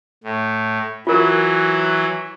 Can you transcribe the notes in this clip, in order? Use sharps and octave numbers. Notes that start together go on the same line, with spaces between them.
A2
E3 F#3 F4 A#4